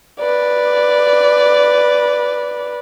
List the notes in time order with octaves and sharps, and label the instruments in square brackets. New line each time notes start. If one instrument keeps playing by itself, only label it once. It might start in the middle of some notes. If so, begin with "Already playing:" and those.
[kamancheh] B4 D5